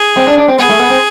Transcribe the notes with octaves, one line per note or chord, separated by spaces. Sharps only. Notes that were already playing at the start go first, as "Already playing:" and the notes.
Already playing: G#4
C4
D4
D4
C4
B3 G#4
A3
B3
C4